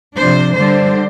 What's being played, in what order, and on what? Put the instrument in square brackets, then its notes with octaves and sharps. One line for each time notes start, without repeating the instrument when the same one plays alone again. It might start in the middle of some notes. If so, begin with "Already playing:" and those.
[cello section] C3 F3 D4 C5
D3 G3 D4 C5